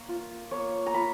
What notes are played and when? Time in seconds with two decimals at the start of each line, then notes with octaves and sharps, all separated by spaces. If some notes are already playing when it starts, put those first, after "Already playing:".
Already playing: A#3 C#5
0.09 F4
0.51 A#3 C#5
0.86 A#5
0.94 F4 B5